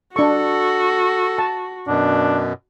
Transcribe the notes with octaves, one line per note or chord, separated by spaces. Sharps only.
D4 F#4 A4 C#6
A5
F#2 B2 D4